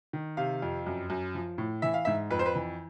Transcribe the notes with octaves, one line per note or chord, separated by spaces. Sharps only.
D#3
C3 F5
F2
F#2
F#2
F3
A2
E3 E5
F5
G#2 E5
F2 B4
C5
B4
E3